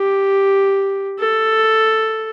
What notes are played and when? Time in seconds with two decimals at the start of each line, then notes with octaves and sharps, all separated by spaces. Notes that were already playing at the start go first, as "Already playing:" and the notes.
Already playing: G4
1.19 A4